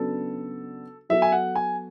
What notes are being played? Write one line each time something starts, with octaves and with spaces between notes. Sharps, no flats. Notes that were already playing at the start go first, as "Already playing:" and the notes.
Already playing: C#3 F#3 B3 D4 F#4 A4
F#3 B3 F#4 A4 E5
G#5
F#5
G#5